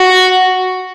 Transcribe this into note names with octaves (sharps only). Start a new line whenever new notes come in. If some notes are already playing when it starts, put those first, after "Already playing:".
Already playing: F#4